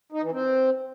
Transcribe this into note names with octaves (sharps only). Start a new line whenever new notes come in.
D#4
E3
C4